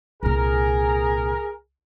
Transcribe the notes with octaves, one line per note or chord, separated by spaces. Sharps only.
C2 A#2 G#4 A#4